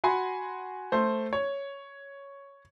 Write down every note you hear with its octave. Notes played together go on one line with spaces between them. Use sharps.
F#4 F#5 G#5 B5 C6
A3 C5
C#5